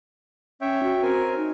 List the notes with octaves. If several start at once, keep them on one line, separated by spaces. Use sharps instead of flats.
C#4 C#5 E5 G5
F#4
C4 A#4 G#5
D#4